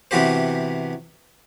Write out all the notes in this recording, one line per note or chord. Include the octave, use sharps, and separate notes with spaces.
C3 E3 B3 F#4 G4 C5